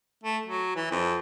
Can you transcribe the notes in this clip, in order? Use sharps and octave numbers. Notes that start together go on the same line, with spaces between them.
A3
F#3
E3
F2